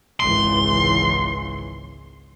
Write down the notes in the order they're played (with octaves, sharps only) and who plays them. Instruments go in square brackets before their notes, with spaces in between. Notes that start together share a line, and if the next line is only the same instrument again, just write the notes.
[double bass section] G#1 C#2 E3 [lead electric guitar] C6